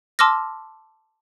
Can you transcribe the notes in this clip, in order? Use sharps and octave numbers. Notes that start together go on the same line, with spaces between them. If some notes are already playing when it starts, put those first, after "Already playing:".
A5 C6 D6 E6 F6 A#6